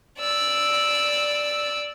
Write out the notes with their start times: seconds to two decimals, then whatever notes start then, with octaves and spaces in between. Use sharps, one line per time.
0.20 D5 E6